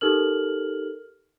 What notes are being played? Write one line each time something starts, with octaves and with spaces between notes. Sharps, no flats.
D#4 G4 A4 A#4 F6 F#7